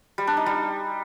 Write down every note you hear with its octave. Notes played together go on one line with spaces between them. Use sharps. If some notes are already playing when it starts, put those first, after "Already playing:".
G3
D4
D#4
G3